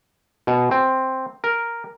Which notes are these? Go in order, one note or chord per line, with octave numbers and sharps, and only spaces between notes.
B2
C4
A#4